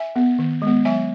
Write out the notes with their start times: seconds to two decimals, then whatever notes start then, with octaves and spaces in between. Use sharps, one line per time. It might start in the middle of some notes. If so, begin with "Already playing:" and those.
Already playing: E5 G#5
0.16 B3
0.39 D#3
0.62 G#3
0.67 B3
0.85 F#3 E5 G#5